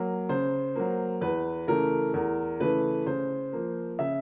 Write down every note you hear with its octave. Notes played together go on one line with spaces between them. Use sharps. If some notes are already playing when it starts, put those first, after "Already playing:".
Already playing: F#3 A#3
C#3 C5
F#3 A#3
E2 B4
C#3 E3 A3 A#4
E2 A#4
C#3 E3 A3 B4
C#3 C5
F3 A#3
C#3 E5